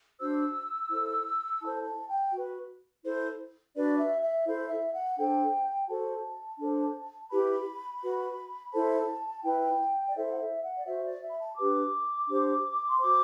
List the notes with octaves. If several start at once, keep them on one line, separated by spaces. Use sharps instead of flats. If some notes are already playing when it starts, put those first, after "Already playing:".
D4 F#4 C5 E6
E4 A4 C5
E4 A4 C5 A5
A5
G5
F#4 B4
E4 A4 C5
D4 F#4 B4 D5
E5
E5
E4 A4 C5
E5
F#5
D4 A4 C5 G5
F#4 A4 C5 A5
D4 A4 C5
E4 G4 B4 B5
F#4 B4
E4 A4 C5 A5
E4 B4 G5
D5
E4 A4 C5 E5
F#5
E5
F#5
D5
F#4 C5 E5
D5
E5
B5
A5
D4 G4 B4 D6
D4 G4 C5
C6
F#4 C5 D6